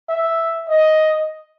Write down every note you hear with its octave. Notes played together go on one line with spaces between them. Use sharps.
E5
D#5